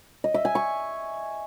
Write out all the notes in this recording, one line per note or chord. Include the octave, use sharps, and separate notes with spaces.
D#5
E5
G#5
C#6